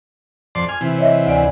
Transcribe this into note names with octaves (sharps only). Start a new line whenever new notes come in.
F2 D5 C6
G#5 F6
C3 E3
C#5 D#5 E5
D2 D5 G#5